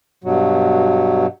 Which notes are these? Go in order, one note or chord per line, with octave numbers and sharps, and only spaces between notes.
G2 B2 F#3